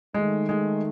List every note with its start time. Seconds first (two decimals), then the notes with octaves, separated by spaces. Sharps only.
0.14 D#3 G#3 A3 D#4
0.49 G#3